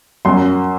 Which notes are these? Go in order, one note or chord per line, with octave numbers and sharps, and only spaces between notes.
F#2 C6